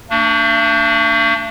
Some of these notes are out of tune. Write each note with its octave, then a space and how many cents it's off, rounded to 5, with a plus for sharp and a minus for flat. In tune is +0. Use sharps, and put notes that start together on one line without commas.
A3 +45 D4 -5